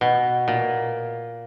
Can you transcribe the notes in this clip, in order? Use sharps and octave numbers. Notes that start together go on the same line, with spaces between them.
B2
A#2